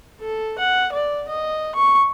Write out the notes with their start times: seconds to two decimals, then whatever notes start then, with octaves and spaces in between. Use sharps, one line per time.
0.20 A4
0.58 F#5
0.92 D5
1.28 D#5
1.75 C#6